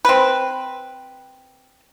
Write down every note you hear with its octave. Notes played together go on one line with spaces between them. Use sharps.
C4 B4